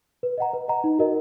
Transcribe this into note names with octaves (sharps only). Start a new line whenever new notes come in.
B4
D#5 F#5 A#5
B4
D#5 F#5 A#5
D#4
F#4 A#4 D#5